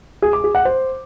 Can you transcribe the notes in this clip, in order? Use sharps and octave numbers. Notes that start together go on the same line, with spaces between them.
G#4
D6
G#4
F#5
C5